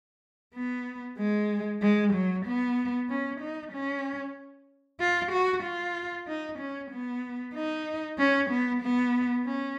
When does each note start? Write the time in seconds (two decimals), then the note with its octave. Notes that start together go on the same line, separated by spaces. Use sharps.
0.55 B3
1.18 G#3
1.82 G#3
2.14 F#3
2.46 B3
3.09 C#4
3.41 D#4
3.73 C#4
5.00 F4
5.32 F#4
5.63 F4
6.27 D#4
6.59 C#4
6.91 B3
7.55 D#4
8.18 C#4
8.50 B3
8.83 B3
9.46 C#4